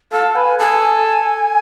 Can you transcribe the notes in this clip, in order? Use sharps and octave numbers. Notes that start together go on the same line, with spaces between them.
A4 F5
B4 G#5
A4 G#5